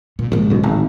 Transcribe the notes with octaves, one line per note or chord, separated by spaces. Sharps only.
A#2
A#1 G#2 C#3
F#1 B1
D1 G#1